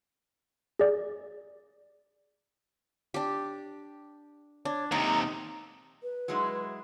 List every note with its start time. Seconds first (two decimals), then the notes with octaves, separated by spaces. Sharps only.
0.79 G#4 D5
3.14 D4 G4
4.65 D4 C#5
4.92 D#2 C3 D#4 A#5
6.01 B4
6.28 F#3 G#3 E4